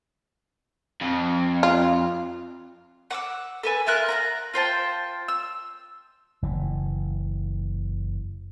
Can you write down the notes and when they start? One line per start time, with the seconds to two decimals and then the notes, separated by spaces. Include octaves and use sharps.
1.01 F2
1.63 F4
3.11 F#5 D6 E6
3.63 A4 B4 G#5
3.86 E4 F4 A#4 F#6
4.09 F#5 G#5 A#5
4.54 F4 C5 G5 A5
5.28 E6
6.42 F#1 E3